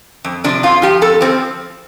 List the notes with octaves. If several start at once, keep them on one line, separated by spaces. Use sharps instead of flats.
F2
C3 F3 D4
F2 F4
F3 G4
F2 A4
F3 C4